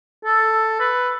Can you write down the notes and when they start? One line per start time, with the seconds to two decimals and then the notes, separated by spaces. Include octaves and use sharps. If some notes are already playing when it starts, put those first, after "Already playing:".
0.25 A4
0.80 B4